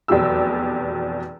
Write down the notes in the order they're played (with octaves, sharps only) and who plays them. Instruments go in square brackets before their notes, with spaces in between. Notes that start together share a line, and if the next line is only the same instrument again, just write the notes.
[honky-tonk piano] F1 E2 B2 F#3 G4 E6